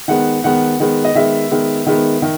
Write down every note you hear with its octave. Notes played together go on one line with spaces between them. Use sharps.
D#3 G#3 B3 F#5
D#3 G#3 B3 F#5
D#3 G#3 B3
D#5
D#3 G#3 B3 E5
D#3 G#3 B3
D#3 G#3 B3
D#3